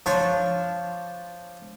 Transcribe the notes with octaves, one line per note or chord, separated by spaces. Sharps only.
F3 D4 C#5